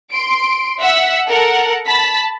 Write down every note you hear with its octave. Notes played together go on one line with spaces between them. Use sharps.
C6 D7
E5 F#5 E6 B6
A4 A#4 F#5
A5 B5 B6